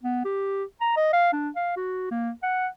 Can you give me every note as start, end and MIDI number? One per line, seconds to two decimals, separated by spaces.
0.03 0.24 59
0.25 0.64 67
0.81 0.96 82
0.97 1.09 75
1.13 1.33 77
1.33 1.49 62
1.56 1.76 77
1.77 2.10 66
2.11 2.31 58
2.43 2.67 78